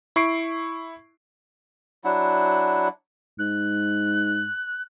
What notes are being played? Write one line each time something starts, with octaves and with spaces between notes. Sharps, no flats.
E4 C#6 C7 D7
F#3 D4 E4 F#5
G#2 F#6